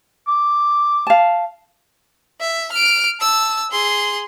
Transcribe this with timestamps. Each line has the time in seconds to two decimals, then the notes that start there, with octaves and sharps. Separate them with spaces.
0.28 D6
1.07 F5 A5
2.41 E5
2.72 F6 D7
3.21 A5 E6
3.71 G#4 C6